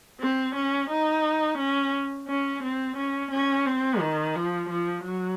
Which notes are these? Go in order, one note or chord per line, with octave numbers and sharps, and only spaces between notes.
C4
C#4
D#4
C#4
C#4
C4
C#4
C#4
C4
D#3
F3
F3
F#3